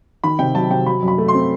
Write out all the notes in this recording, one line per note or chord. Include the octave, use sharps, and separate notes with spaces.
D#3 B5
C3 G5
F#3 A5
C3 G5
F#3 B5
F#2
B5
A3
C6
C4